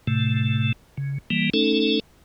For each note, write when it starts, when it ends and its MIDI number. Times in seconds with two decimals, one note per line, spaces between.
0.07 0.72 45
0.07 0.72 48
0.07 0.72 57
0.97 1.18 49
1.30 1.50 52
1.30 1.50 55
1.30 1.50 58
1.54 2.00 57
1.54 2.00 61
1.54 2.00 63
1.54 2.00 69